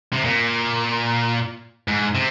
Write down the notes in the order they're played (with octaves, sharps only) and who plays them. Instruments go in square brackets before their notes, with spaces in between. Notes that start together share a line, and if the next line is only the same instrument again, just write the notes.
[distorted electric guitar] C3
A#2
G#2
C3